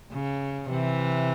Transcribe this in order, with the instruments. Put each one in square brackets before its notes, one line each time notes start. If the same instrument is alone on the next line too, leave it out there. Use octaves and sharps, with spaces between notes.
[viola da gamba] C#3
C3 E3